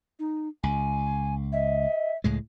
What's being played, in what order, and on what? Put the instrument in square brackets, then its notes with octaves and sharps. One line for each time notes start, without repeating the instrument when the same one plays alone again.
[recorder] D#4
[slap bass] C#2 [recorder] G#5
[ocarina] D#5 [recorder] E5
[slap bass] C#2 A2 G#3